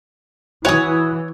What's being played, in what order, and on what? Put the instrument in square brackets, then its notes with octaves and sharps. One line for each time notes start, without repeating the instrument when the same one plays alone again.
[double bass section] E3 [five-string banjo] F#4 G#5 [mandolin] C#5 D#6